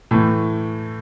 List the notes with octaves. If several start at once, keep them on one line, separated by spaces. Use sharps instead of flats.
A2 E3 A3